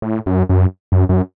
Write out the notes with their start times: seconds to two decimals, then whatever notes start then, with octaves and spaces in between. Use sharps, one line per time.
0.02 A2
0.26 F#2
0.49 F#2
0.92 F#2
1.09 F#2